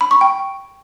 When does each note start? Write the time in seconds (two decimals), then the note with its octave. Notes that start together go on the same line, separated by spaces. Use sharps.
0.01 B5
0.11 C#6
0.21 G5